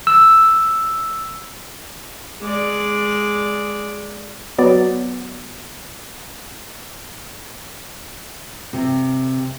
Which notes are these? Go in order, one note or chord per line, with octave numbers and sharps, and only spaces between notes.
E6
G#3 D5
F#3 B3 D5
C3